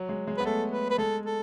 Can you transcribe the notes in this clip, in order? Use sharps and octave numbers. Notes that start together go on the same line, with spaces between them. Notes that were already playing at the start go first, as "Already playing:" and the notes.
Already playing: F#3
G#3
G#3
B4
B3
A3 A4
B4
B4
G#3 A4
A4